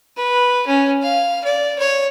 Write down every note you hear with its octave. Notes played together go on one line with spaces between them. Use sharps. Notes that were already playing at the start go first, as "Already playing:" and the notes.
B4
C#4
F5
D5
C#5